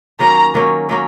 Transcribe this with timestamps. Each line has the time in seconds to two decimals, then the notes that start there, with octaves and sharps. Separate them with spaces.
0.19 D#3 F#3 A#3 C#4 A#5
0.54 D#3 F#3 A#3 C#4
0.89 D#3 F#3 A#3 C#4